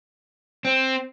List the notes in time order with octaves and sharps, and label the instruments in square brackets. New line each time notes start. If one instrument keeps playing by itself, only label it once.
[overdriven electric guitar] C4